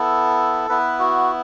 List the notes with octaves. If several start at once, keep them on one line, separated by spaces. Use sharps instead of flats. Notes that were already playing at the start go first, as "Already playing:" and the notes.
Already playing: B3 E4 A4
B3 E4 B4
F#4